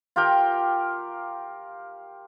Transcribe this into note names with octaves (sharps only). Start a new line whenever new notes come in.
F4 G4 A#4 G5